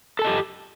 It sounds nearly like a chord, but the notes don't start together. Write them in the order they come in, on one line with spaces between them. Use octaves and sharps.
A4 A5 D#5 G4